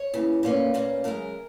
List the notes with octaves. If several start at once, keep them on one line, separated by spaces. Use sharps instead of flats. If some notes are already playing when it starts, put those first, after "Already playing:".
Already playing: C#5
D#2 C#3 E3
A#2 A#3 C#4 B4
A#2 A#3 C#4
F#2 C#3 G#3 A#4